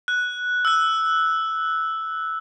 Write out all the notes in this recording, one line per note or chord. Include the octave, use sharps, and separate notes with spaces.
F#6
E6 F#6